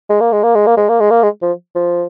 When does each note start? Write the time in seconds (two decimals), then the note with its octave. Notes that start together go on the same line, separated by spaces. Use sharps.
0.09 G#3
0.21 A#3
0.32 G#3
0.43 A#3
0.55 G#3
0.67 A#3
0.77 G#3
0.89 A#3
1.00 G#3
1.11 A#3
1.23 G#3
1.42 F3
1.75 F3